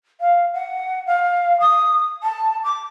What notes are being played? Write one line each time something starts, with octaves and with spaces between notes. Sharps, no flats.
F5
F#5
F5
D#6
A5
D6